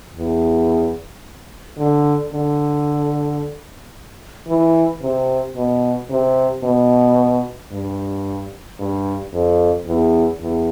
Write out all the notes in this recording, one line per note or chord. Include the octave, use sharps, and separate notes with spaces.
E2
D3
D3
E3
C3
B2
C3
B2
G2
G2
F2
E2
E2